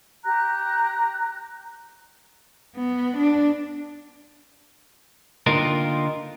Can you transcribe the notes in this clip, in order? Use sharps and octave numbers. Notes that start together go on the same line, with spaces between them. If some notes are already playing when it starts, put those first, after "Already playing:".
G4 A#5 F#6
B3
D4
D3 A#3 D#4 F4 G4 A#4